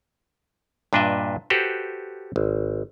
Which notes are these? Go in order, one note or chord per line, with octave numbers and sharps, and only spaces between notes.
G2 A#2 D4 B4 D#5 E5
F#4 G4 A4 B4 C5
G#1